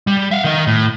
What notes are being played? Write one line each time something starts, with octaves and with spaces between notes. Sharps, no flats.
G3
E5 F5
D#3 D#5
A2